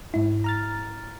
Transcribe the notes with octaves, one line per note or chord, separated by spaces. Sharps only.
G#2 E4
A#5 F6 A6